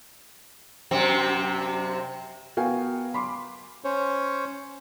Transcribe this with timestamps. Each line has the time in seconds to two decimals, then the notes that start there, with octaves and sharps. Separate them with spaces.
0.91 F#2 C3 C4
2.57 B3 F#4 A#4 F5 G5 G#5
3.14 B5 C6 D6
3.84 C#4 C5 C#5